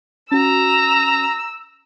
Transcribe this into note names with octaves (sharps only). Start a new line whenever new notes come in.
C#4 F#4 A#5 E6